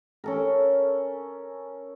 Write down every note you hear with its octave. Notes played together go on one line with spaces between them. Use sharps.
C#4 A4 A#4